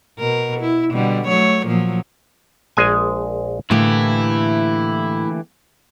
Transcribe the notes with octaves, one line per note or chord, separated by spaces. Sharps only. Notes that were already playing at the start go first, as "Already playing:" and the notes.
B2 A#4
E4
B2 D3 G3
F#3 A3 C#5
A#2 F3 F#3
A#1 G#3 G#5
A2 D3 E3 A3 A#3 E4 G4